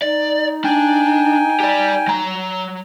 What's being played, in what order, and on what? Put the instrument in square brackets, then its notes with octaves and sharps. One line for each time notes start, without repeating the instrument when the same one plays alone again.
[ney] D#4 [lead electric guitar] D5
[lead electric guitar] D4 [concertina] G5 G#5
[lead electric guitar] G4 D5
F#3 A#5